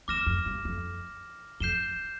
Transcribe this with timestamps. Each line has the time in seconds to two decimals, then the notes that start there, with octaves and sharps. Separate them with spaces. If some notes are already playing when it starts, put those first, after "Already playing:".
0.08 E2 D6 F6 A#6 E7
0.26 F2
0.46 G2
0.65 F2
1.60 F2 G6 C7 E7 G7